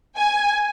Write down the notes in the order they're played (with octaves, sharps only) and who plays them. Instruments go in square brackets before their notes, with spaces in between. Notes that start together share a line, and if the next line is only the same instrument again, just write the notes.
[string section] G#5